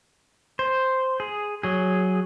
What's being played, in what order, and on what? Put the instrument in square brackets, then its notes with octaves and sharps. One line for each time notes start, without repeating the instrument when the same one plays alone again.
[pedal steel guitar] C5
G#4
F#3 G#4